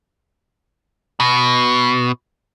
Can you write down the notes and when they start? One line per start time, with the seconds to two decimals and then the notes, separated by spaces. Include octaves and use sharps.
1.20 B2